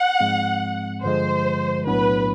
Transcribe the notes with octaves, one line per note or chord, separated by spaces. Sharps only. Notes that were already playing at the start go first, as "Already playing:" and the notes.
Already playing: F#5
G#2 F3 G#3 C4
G2 D3 F3 G#3 C5
B1 A2 F#3 B3 D4 B4